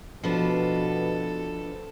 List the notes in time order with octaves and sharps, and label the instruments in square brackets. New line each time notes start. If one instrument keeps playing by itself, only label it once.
[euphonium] B2 [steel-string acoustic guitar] F3 D4 B4 [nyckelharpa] A4